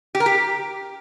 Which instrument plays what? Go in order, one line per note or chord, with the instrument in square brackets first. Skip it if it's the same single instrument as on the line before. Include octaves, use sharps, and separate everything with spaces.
[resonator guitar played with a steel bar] G4
A#4
G4